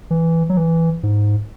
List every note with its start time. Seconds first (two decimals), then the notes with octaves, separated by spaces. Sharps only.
0.11 E3
0.49 F#3
0.57 E3
1.03 G#2